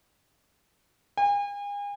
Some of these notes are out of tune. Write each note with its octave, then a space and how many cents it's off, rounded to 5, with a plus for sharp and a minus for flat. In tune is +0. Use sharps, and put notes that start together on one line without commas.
G#5 -40